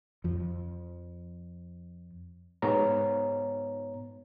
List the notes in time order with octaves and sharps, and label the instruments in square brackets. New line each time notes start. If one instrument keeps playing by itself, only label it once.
[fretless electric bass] F2 F3
[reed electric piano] G#2 B3 C#5 A#5